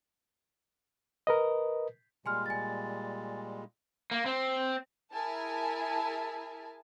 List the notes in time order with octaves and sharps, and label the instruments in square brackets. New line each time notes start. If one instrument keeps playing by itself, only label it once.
[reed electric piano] A#4 B4 D#5
[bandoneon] A#2 G3 G#3 [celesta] G#5 C6 F6
[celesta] G#5 A6
[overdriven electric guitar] A#3
C4
[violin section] E4 G#4 A#4 E5 G#5 A5